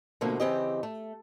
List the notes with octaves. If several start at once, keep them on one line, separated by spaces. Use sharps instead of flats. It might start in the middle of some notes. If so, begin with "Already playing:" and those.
B2 D3 F3 A3 A#3
C#3 E3 C4 G4 D#5
A3